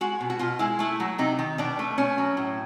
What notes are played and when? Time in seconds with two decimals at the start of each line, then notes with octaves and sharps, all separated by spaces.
0.01 G#3 F#4
0.20 B2
0.30 F#4
0.39 B2 F4
0.59 G#3 E4
0.79 A3 E4
1.00 F#3
1.18 C3 D#4
1.39 D#3
1.58 B2 D4
1.79 A3
1.98 B2 C#4
2.18 F#3
2.37 A2